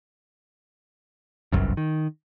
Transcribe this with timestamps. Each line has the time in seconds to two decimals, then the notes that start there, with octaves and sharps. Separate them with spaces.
1.52 G1 C2 F#2
1.77 D#3